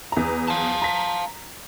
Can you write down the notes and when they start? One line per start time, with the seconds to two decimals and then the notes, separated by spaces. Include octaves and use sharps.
0.12 E2 A#5
0.48 F5 A5
0.82 A#5 B6